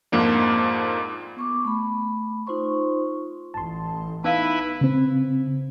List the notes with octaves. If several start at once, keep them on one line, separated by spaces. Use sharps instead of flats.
F2 G#2 F3 A#3 D4
B3 C#6 D6
A3 B5
D#4 F4 C5 C6 C#6
A1 A5 C6
B3 D#4 E4 B4 F5 A5
C#3 C4